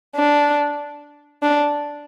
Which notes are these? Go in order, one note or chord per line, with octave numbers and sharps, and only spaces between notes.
D4
D4